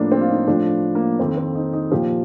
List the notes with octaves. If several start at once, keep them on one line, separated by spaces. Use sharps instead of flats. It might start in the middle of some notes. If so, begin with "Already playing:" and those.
Already playing: A2 F3 A#3 D4
C4
F4
D#4
A2 F3 D4
A#3
F2 D#3 C4
C4
D#4
D#4
A#2 F3 G4